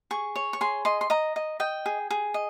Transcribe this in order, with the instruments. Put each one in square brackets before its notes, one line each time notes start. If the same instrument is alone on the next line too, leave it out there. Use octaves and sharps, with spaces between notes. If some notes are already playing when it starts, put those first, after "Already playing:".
[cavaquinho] G#4 C#6
C#5
C#6
G#4 C6
D#5 C6
C6
D#5 A#5
D#5
D#5 G5
G#4
G#4
D#5